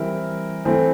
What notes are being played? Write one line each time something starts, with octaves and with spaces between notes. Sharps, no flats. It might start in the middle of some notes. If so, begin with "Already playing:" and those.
Already playing: E3 G3 C4 E4 A#4
E3 A3 C4